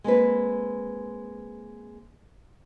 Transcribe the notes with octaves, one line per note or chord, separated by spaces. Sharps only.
G#3 A#3 C4 B4